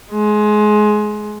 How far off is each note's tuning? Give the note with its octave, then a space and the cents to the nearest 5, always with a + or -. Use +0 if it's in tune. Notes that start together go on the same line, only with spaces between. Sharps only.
G#3 +20